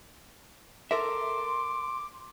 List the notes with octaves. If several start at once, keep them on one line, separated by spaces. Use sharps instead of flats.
A4 A#4 E5 C6 D6